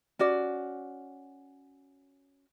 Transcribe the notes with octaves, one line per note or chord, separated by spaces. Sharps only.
C#4 F#4 D5